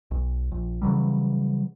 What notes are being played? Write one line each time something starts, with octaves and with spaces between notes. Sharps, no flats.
B1
A#1
C#3 E3 F#3 G3